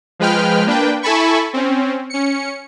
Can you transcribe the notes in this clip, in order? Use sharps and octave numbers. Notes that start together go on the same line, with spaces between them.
F3 G#3 B4 G5 F6
A#3 D4 B4 G5
E4 A4 G#5 A5 B5 C#6
C4 C#4
C#4 C#7